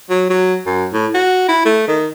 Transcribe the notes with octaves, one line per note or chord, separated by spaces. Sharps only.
F#3
F#3
F#2
A2
F#4
E4
A3
D#3